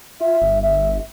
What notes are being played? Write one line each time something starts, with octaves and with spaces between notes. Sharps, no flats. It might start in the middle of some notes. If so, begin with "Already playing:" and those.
F4 E5
G1
E5